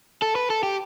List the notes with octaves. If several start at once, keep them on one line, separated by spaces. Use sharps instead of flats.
A4
B4
A4
G4